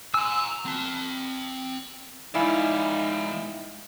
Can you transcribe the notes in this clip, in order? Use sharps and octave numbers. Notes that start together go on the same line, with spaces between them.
G#5 A#5 E6
C4 A5
G#3 D#4 E4 D5 E5 F5 G#5